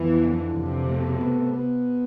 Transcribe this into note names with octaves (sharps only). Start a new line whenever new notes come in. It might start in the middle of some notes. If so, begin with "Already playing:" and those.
Already playing: F2 E3 B3
D3
F2 C3
A3
B3
B3